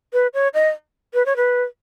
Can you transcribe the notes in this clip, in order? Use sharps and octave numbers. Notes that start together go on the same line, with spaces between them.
B4
C#5
D#5
B4
C#5
B4